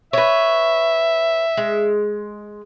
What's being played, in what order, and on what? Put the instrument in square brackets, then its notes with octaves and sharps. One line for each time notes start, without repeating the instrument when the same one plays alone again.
[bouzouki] B4 C#5 [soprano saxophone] E5
[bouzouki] G#3